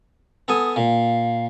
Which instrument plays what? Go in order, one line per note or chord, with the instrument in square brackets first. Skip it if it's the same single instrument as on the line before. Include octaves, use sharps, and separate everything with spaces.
[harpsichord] B3 A4 G#5 [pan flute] D#6
[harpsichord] A#2 [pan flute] F5